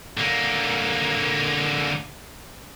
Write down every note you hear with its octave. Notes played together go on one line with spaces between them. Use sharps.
D3 A#3